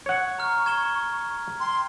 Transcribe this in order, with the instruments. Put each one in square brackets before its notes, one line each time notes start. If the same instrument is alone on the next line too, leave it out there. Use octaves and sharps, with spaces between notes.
[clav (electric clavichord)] C#5 F#5 [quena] C#6
[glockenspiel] A#5 F6
G#6 E7 G7
[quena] G5 [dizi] C6